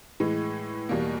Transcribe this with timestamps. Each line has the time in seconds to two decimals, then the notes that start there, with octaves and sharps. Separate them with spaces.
0.20 A2 E3 G#3
0.89 E2 B2 G3 A#3